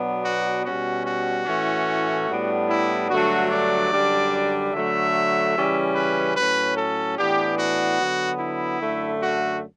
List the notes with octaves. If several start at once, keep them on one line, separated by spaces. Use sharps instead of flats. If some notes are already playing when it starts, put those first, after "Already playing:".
Already playing: B2 F#3 B3 D4
F#4
B2 G3 C#4 F#4
F#4
A2 E3 A3 C#4
A2 G3 B3 D4
E4
G2 D3 F#3 A3 D4 F#4
D5
F#2 D3 G3 D4
D3 F#3 A3 E5
C#3 E3 G3 C#4
B4
A2 F#3 C#4 B4
A4
A2 E3 B3 D4 G4
F#4
D3 F#3 B3
E4
F#2 D3 A3
F#4